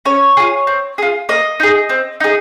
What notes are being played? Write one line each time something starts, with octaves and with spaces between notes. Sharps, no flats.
C#4 C#5
F4 G#4
C4
F4 G#4
A#3 D#5
D#4 G#4
C4
D#4 G#4